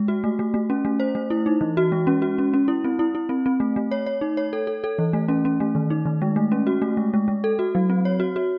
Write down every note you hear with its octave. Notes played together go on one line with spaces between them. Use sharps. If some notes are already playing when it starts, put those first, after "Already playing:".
Already playing: G#3
F#4
A3
A3
A3
C#4
A3
C5
A3
E4
D#4
E3
F#4
G#3
C#4
F#4
C#4
C#4
E4
C4
E4
E4
C4
C4
A3
A3
C#5
C#5
D#4
C#5
A4
A4
A4
E3
A3
C#4
C#4
A3
D#3
D#4
D#3
G#3
A3
C#4
F#4
A3
G#3
G#3
G#3
A4
F#4
F#3
C4
C#5
F#4
F#4